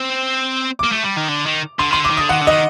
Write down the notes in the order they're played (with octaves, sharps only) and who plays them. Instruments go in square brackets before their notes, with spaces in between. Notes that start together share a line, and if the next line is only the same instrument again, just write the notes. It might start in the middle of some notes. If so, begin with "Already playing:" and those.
Already playing: [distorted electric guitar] C4
[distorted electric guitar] A#3 [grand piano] D6
[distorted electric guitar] A3
G3
D#3
D3
D#3
[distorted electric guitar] D3 [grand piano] C6
[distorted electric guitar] D#3 [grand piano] C6
[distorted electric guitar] D3
[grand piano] D6
[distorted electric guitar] D#3
[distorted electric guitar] D3 [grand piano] D#6
[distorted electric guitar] D#3 [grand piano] F#5
[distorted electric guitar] D3
[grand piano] D#5
[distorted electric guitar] D#3